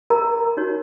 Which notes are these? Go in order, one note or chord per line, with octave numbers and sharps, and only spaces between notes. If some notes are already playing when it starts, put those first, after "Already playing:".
A#4 A#5
D#4 F#4 C#5